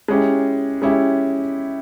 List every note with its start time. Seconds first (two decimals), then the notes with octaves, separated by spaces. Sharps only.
0.08 G#3 C#4 E4 G4
0.82 G#3 C#4 E4 G4